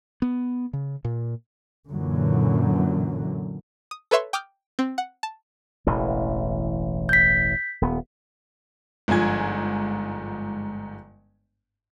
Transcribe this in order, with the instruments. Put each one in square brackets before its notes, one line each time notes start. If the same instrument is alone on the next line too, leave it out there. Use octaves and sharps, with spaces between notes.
[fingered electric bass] B3
C#3
A#2
[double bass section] F#2 A#2 D3 E3 F#3
[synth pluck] D#6
A4 B4 C#5 E5 C6 C#6
G5 D6 D#6 F6 G6
C4
F#5
A5
[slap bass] E1 A1 E3
[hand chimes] G6 B6
[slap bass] D#1 B3
[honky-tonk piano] G1 G#2 F3 G#5 G#6